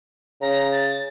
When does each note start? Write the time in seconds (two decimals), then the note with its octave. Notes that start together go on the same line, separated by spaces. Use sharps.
0.41 C#3 A#5
0.72 A6